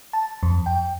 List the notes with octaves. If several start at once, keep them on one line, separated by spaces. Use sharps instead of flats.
A5
F2
G5